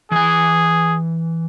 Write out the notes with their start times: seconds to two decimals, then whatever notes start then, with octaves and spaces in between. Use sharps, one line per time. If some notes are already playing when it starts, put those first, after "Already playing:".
0.11 E3 G#4 G#5